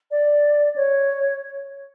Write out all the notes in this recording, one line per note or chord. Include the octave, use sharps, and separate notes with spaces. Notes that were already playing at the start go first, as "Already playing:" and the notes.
D5
C#5